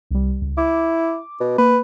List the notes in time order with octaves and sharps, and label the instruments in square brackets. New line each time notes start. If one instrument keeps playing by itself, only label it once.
[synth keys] C2 G3
C#2
[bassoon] E4 [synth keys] D6
[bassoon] B2
[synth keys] A#3 [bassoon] B4